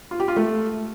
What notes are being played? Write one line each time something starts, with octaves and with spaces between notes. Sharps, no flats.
F4
G4
F4
A3